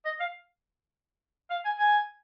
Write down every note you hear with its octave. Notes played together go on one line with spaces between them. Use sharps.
D#5
F5
F5
G#5
G#5